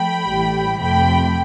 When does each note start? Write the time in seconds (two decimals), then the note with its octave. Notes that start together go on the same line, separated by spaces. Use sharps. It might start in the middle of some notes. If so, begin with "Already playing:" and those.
Already playing: F3 A3 G5 B5
0.27 A1 A2 E3 G3
0.80 F2 C3 F3 A3 G5 B5